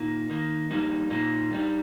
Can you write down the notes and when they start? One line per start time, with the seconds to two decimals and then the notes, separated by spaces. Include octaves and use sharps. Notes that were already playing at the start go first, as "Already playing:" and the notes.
Already playing: A#2 A#3 D#4
0.30 D#3 A#3 D#4
0.71 G2 G3 A#3 D#4
1.10 A#2 A#3 D#4
1.51 G2 G3 D#4